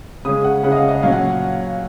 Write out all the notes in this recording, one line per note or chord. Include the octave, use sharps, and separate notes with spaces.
C#3 G#3 C#4 D#6
F#5
C#3 G#3 C#4 F#5
D#5
F5
D#5
A#2 F#3 C#4 F5
F#5